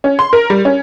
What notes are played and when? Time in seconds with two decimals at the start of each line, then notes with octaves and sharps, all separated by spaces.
0.04 C#4
0.19 C6
0.33 A#4
0.50 G3
0.65 C#4